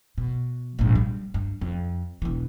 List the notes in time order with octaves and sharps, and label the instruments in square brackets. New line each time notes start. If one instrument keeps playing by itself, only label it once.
[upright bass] B2
A#1 G#2
G3
G2
F2
E1 E3